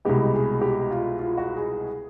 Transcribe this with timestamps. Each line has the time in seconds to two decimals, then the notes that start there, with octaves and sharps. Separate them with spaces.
0.05 C2 B2 G#3 B3 G4
0.34 G#4
0.61 G4
0.91 F4
1.19 F4
1.38 F#4
1.56 G#4